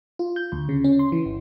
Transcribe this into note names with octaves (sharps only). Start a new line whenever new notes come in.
F4
G6
D2
C#3
C#4
C6
E3
G1